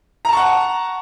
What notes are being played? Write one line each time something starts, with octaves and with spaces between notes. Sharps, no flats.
F#5 A5 A#5 C#6